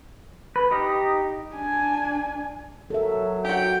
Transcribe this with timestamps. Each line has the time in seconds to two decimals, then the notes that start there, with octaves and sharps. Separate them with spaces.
0.56 B4
0.71 D#4 G4 D#5
1.55 D4 G#5
2.90 F#3 A4 A#4 E5
3.45 F#4 G4 G5